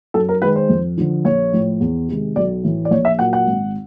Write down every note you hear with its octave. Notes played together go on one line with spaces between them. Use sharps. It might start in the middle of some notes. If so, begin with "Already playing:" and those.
F#2 A4
A#4
D#3 G#3 B4
C5
F2
D3 F3
A#1 C#5
A2 F3
E2
C3 D#3 G#3
B1 D5
A2 E3 A3
D5
A#1 C#5
E5
A#2 F#3 A#3 F#5
F#5
G#1